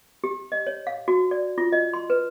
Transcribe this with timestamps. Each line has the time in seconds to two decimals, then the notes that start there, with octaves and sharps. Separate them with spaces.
0.24 G4
0.52 D#5
0.67 C#5
0.87 F5
1.08 F#4
1.31 D5
1.58 F4
1.72 D#5
1.93 C6
2.10 B4